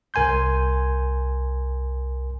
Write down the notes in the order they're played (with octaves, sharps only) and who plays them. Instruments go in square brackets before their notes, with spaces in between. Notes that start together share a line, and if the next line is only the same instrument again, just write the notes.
[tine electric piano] C2 A#4 G#5 C6 G6